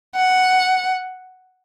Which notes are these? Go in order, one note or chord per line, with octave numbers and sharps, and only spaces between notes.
F#5